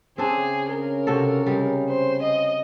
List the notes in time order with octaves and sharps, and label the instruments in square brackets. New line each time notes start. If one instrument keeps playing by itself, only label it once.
[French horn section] C#3 [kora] C4 D4 [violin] G#4
[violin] A#4
[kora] C3 F#4 A4
G3 G#3
[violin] C5
D#5